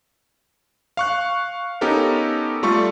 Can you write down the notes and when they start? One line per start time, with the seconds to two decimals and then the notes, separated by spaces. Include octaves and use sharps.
0.97 F5 C#6 F#6
1.81 B3 C#4 D#4 G4 A4 A#4
2.63 G3 A3 F4 C#6